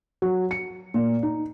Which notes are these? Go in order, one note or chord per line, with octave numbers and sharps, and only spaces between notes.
F#3
C#7
A#2
D#4